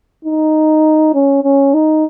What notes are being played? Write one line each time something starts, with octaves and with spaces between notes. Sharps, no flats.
D#4
C#4
C#4
D#4